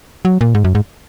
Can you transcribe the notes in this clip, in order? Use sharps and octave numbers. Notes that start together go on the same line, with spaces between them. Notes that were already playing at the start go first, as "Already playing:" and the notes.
F#3
A#2
G#2
F#2
G#2